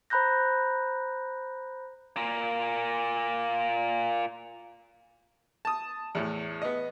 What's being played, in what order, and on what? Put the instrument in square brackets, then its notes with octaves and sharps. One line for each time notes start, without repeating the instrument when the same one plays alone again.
[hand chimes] C5 A#5 B5 F#6 G6 A#6
[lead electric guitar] A#2 A#3
[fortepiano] A5 D#6
E2 A2
B3 D#5